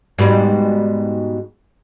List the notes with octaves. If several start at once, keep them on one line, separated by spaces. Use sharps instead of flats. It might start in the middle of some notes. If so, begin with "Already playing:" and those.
G#2 B2 G3